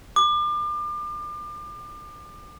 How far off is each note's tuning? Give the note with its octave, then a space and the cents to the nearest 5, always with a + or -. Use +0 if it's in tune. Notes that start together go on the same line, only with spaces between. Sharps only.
D6 +35